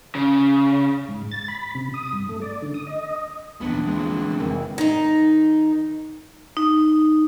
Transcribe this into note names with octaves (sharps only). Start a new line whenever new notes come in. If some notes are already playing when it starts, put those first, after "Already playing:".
C#3
G#2
A6
B5
C3
D#6
G2
A3
D5
D3
D#6
D#5
D#1 B1 E3 F3 B3 C4 D4
D2 G#3
F1 D#3 E3 C4
D#3 D#4
D#4